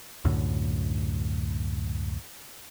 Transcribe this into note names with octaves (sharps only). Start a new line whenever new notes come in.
C#2 F#2 A2 D3